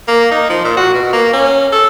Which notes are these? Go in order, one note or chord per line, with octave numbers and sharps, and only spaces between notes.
A#3
D#4
F3
A#2
F#4
B2
A#3
C#4
A4